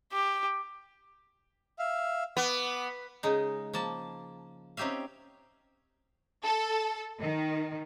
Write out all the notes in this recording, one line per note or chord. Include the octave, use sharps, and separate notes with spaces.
G4
E5 F5
B3 D6
C#3 G#3 D#4
F3 A#3 A5
C4 C#4 D#4 G4 E5 F5
A4
D#3